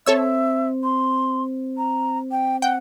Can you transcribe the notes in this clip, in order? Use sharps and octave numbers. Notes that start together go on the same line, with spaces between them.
C4 A4 C5 C#5 E5 E6
C6
A#5
G5
F#5 G5